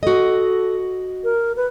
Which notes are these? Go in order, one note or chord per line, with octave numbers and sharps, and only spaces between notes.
F#4 A4 D#5
A#4
B4